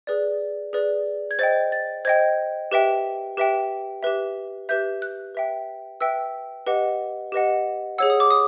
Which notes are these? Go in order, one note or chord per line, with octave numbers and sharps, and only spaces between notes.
G#4 B4 D5
G#4 B4 D5
G#6
C5 D#5 G5 A6
A6
C5 D#5 G5 G#6
G4 B4 E5 G5
G4 B4 E5 G5
G4 B4 E5
G4 B4 E5 G6
F#6
B4 E5 G5
B4 E5 G5 E6
G4 B4 D#5 F#5
G4 B4 D#5 F#5
G#4 C#5 F#5 E6
D#6
D6
D#6